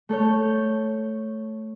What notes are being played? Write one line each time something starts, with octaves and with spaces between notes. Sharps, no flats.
A3 A4 C#5 G6